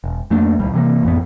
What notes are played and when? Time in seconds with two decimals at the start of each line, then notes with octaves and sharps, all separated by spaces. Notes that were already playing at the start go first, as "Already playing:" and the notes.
0.04 E1
0.30 F2 A3 A#3 D4
0.59 D#1 C#2 G3
0.74 C3 E3 A3 A#3
1.03 A1 F2 B3